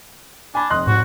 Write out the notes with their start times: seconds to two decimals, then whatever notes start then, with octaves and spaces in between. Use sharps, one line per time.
0.55 D4 G#5 B5
0.70 F1 D#5 C6 F#6
0.87 G#2 F#4